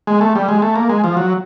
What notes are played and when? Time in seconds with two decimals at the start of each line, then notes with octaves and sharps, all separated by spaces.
0.07 G#3
0.21 A3
0.35 G3
0.49 G#3
0.62 A3
0.76 A#3
0.89 G#3
1.04 F3
1.17 F#3